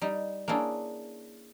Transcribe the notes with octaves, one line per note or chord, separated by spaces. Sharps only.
G3 D#4
A#3 C#4 D4 E4 G#4